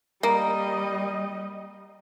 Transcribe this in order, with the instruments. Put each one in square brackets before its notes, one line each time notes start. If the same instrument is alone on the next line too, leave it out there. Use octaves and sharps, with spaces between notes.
[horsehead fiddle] G3 D#5 [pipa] A#3